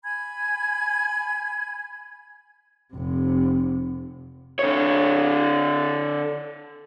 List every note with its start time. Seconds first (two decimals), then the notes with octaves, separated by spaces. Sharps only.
0.04 G#5 B5 G#6
2.94 F1 C3
4.59 D3 C#5